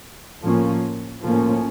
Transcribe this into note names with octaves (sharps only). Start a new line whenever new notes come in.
A2 F3 A#3 C#4
A2 F3 A#3 C#4